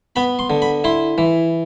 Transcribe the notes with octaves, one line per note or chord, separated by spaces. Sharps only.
B3 B5
C6
D3
B5
E4 C6
E3